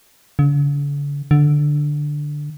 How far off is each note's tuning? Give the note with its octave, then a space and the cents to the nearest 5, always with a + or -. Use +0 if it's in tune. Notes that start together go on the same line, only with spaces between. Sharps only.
D3 -45
D3 +5